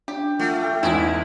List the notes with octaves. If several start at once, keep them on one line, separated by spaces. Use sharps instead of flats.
D4 G4
A3 F4 F#5 F6
G5
E2 G#2 E3 G#3 E4